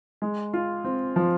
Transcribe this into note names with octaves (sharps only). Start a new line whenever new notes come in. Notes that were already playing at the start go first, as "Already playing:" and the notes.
G#3
F4
C4
F3